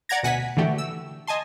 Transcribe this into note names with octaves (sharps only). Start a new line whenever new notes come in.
D5 F#5 A#5 G#6 A#6
D2 B2 F#5 G#5 B6
D3 E3 A3 F#4 G4
E6
D#5 G#5 A5 C6